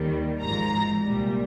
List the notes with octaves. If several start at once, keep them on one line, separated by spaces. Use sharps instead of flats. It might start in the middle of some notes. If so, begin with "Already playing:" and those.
Already playing: D#2 D#3 G3
G#1 G#2 F3 A#5
C2 A#2 G3